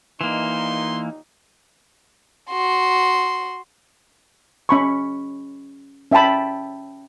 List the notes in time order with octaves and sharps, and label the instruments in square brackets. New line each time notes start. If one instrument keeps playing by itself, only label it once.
[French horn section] D#2 A#2 D#4 [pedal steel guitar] E3 A#3 [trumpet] C6
[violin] F#4 C6
[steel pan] C#4 B5 C#6
C#4 E5 G5 A5 B5